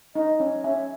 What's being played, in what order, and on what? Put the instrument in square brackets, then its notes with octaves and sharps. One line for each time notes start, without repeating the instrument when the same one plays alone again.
[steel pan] D#4 [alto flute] D#5
[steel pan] C#4
[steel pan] C#4 [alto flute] E5